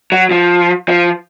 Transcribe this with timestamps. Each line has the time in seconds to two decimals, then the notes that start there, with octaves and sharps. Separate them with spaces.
0.12 F#3
0.31 F3
0.88 F3